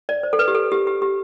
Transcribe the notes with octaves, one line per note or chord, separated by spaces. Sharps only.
D5
C5
A4
B4
G4
A4
G4
G4
G4